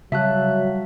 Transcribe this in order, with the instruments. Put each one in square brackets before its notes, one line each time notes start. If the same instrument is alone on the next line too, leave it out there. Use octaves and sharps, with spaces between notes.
[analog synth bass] C#3 [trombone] F#3 [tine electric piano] G3 F#4 F5 [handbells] E5 A5 F#6